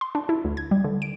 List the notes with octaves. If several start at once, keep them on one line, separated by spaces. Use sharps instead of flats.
C6
D4
E4
D2
G#6
G3
D3
D7